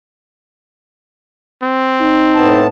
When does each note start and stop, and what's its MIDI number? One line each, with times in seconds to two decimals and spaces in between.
1.63 2.65 60
2.01 2.68 63
2.35 2.67 45
2.35 2.67 59
2.35 2.67 81